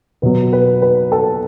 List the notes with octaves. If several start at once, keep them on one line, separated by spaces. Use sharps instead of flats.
B2 F#3 B4
B4
B4
A4